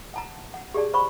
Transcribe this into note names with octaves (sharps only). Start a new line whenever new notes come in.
F#5 A5 A#5
F#5
G4 G#4 D5 A5
C5 F#5 B5 C#6